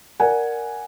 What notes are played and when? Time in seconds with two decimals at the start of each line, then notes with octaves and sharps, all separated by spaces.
0.20 A#4 D5 F#5 G#5